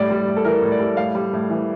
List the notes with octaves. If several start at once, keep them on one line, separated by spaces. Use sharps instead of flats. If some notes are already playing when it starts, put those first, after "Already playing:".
Already playing: A2 G3 D5
G3
A2
A4
E3 A#4
A2
D5
G3
A2 F5
G3
A2
E3